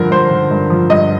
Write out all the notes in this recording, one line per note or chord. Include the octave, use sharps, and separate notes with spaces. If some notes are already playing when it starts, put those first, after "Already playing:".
Already playing: G2 D3 F3 A#4
G2 C5
D3
G2
F3
G2 D#5